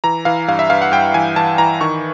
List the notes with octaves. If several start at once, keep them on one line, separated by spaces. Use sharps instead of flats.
E3 A#5
E3 F5
G2 F5
E5
G2 F5
F#5
G2 G5
E3 G#5
E3 A5
E3 A#5
D#3 C#6